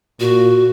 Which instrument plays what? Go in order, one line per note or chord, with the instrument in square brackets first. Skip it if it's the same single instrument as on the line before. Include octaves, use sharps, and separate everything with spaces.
[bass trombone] A#2 [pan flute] F#4